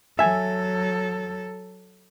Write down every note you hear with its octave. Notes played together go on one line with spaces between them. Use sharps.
F#3 A4 E5 G#5